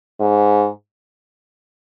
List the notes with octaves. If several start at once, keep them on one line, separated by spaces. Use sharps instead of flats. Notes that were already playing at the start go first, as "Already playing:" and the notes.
G#2